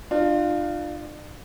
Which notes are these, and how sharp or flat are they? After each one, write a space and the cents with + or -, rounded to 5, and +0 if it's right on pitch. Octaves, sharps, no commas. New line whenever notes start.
D4 +40 F4 +0